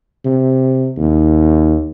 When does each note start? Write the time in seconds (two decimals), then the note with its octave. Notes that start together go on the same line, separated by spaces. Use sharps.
0.25 C3
0.97 D#2